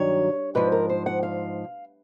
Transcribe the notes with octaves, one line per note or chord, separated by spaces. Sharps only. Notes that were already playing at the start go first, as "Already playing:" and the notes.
Already playing: G2 D#3 F#3 C#5
G#2 F3 B4
A#4
C5
F#5
F5